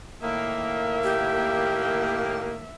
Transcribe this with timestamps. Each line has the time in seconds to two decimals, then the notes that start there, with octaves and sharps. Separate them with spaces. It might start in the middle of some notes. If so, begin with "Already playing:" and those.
0.22 A2 D#3 A#3 E5
1.04 G4